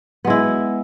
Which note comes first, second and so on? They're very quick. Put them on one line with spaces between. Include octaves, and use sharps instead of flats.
B3 G#3 E4